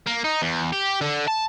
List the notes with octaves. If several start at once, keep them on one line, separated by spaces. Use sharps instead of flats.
A#3
D#4
E2
G4
D3
A5